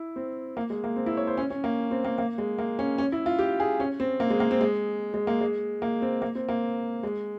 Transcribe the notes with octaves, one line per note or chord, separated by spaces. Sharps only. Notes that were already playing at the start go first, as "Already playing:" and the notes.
Already playing: E4
C4
A#3
G#3
A#3
C4
E4
C#5
C5
C#4
C#4
A#3
C4
A#3
A#3
G#3
A#3
C#4
C#4
E4
F4
G4
G#4
C#4
C4
A#3
G#3
A#3
C4
G#3
G#3
A#3
G#3
A#3
C4
A#3
C4
A#3
G#3